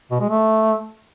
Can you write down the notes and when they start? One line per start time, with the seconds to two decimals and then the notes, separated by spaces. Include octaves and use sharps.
0.11 B2
0.20 G#3
0.30 A3